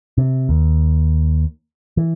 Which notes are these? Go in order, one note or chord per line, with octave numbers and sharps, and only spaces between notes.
C3
D#2
E3